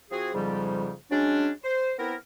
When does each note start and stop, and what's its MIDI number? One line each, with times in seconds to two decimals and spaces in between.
0.11 0.33 53
0.11 0.33 60
0.11 0.33 66
0.11 0.33 68
0.34 0.92 41
0.34 0.92 44
0.34 0.92 49
0.34 0.92 53
0.34 0.92 55
1.11 1.49 54
1.11 1.49 56
1.11 1.49 61
1.11 1.49 62
1.64 1.92 72
1.99 2.15 59
1.99 2.15 60
1.99 2.15 64
1.99 2.15 70